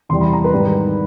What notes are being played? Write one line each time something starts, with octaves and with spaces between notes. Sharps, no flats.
E2 C3 E3 G3 C6
B5
A#5
B4 B5
G#2 D#3 G3